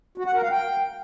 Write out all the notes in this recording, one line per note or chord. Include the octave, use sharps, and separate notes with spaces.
F#4
F#5
A#4
F5
G5